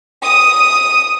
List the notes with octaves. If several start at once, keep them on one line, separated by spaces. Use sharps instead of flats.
D#6